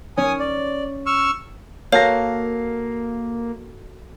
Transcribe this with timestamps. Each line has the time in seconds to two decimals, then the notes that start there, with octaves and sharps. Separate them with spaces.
0.17 C#4 G#5 D#6
0.39 D5
1.06 C#6 E6 F6
1.92 A#3 F#4 A4 A#4 C#5 F5 A#6